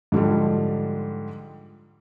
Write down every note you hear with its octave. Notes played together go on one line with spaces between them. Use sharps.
G#2 D3 F3 G3